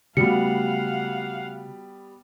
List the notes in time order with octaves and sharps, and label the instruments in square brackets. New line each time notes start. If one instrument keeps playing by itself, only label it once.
[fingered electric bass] C#3 A3 [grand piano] G3 B3 [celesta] F#4 C#7 [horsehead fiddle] F5 F#5